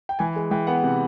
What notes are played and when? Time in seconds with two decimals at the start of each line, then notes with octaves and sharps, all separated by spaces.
0.09 G5
0.19 E3 G#5
0.36 G#3
0.51 E3 G5
0.67 B3 F#5
0.83 C3